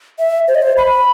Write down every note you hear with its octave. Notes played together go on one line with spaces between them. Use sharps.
E5
C5
D#5
C5
B5